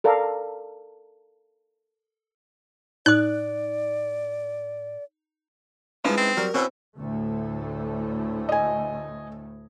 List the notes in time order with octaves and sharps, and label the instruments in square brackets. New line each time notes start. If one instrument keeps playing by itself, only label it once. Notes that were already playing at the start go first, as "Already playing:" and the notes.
[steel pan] A4 A#4 D5 F5
[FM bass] A2 [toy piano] D#4 D#6 [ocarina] D5 [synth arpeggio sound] F#6
[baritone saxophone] F3 [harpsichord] G#3 B3 [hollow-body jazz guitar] C#4 D#4 E4
[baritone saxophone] C4
[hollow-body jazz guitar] F#3 G3 [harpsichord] A#4
[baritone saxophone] B2 [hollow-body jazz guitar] C4 [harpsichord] C#4 E4
[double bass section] D2 A2 A3
[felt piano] D#5 G#5